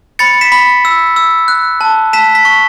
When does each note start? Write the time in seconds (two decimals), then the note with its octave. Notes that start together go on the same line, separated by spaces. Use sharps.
0.19 B5 A6 C#7
0.41 B6 E7
0.52 B5
0.85 E6
1.16 E6
1.48 F#6
1.81 A5
2.13 A5 B6 E7
2.35 B6
2.45 C#6